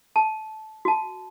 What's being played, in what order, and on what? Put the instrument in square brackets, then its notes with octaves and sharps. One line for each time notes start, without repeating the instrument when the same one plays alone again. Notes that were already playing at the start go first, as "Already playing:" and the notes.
[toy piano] A5
F#4 A5